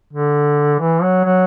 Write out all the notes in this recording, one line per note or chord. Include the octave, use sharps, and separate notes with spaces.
D3
E3
F#3
F#3